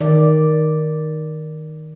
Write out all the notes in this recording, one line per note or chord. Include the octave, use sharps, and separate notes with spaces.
D#3 D5